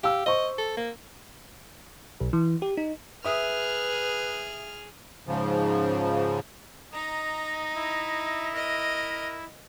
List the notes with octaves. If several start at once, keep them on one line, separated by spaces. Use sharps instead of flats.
G4 F5 E6
C5 D#5 C#6
A4
A#3
B1
E3
G4
D#4
G#4 B4 E5 D#6 F6
G#2 C#3 F3
D#4 D#5 A#5
E4 E5
A#4 D#5